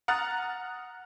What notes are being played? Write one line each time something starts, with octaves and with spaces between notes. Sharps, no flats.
F#5 A#5 D#6 F6 F#6 A6